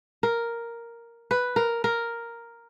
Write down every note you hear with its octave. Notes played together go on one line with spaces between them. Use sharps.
A#4
B4
A#4
A#4